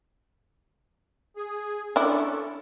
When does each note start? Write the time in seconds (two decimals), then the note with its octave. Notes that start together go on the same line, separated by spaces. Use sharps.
1.36 G#4
1.96 C#4 D4 E4 A4